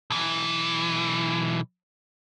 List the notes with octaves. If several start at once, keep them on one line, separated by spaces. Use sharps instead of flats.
B1 E3